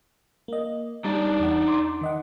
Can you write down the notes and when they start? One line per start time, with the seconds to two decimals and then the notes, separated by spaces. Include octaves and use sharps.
0.48 A#3 D#5
1.04 G3 D4 D#4 D5
1.40 E2 F#5
1.68 C6 D6
2.01 D#3 D#5 F#5